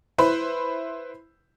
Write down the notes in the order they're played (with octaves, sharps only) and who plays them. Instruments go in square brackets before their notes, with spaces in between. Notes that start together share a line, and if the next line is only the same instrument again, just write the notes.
[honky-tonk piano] E4 B4 C5 B5